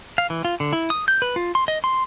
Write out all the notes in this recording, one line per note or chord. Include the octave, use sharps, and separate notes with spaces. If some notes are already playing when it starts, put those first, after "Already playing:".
F5
E3
F4
D3
E4
D#6
G6
B4
F4
C6
D#5
C6